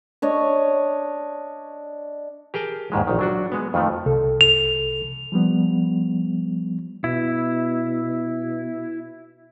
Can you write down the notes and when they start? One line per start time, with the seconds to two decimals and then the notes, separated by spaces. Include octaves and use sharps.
0.22 D4 C#5 D#5
2.54 G4 G#4 A#4 G5 A5
2.92 D#2 G#2 D#3 G#3
3.07 A#1 D#3
3.19 F#3 D4 F#4
3.52 G#3 B3
3.74 F2 D#3 F3 A3
4.06 C2 C3 A4
4.41 F7
5.32 F3 G3 B3
7.04 B2 E4